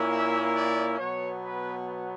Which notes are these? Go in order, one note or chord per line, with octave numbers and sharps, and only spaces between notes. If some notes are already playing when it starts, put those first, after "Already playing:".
Already playing: A#2 A#3 C#4 E4
E5
D5
B2 F#3 B3 C#5
B4